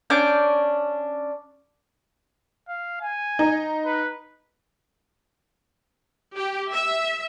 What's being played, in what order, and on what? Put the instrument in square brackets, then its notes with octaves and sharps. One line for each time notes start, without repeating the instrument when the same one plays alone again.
[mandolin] C#4 D4 D6 G6
[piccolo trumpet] F5
G#5
[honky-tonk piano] D#4
[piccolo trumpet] B4
[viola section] G4
E5